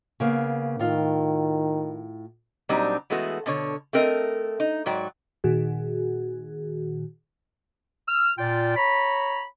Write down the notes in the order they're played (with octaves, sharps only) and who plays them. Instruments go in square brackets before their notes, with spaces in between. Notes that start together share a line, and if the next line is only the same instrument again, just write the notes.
[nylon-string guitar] C#3 A#3 B3
[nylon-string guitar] A2 F4 [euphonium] D#3
[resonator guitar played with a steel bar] A#2 F#3 G3 C4 D4 D#4
E3 G#3 A3 B3 F#4
B2 D3 C#5
A3 C4 A#4 D#5
D#4
G#2 F#3 D5 G5
[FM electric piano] A#2 D#3 F#4 G#4
[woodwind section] E6 F6
A#2 F4 D5 G5
C#5 A#5 B5